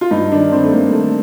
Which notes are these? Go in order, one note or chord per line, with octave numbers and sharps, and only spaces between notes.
F4
G2 D#4
D#3 D4
D#3 C4
A3
G2 A#3
D#3 A3